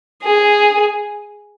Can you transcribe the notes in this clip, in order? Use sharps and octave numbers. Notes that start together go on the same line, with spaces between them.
G#4